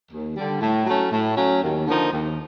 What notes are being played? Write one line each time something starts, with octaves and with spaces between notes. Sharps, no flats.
D#2
D3 G3
A2
F#3 A3 C#4
A2
F#3 A3 C#4
D#2
D3 F3 A#3 D#4
D#2